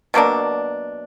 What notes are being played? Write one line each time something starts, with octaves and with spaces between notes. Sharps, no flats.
B2 F#3 A#3 D4